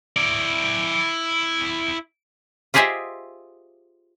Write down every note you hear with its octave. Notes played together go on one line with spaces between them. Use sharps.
E4 D5
F4 G4 G#4 C5 D#5 E5